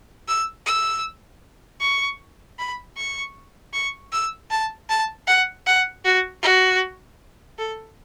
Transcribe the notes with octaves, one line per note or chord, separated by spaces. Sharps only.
E6
E6
C#6
B5
C#6
C#6
E6
A5
A5
F#5
F#5
F#4
F#4
A4